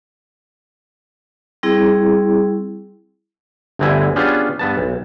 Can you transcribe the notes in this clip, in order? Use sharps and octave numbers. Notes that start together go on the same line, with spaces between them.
G3 C4 E4 G#4
G1 D2 D3 C4 E4 G#5
B3 C#4 D4 F4 G4 G#4
G2 B3 A5
B1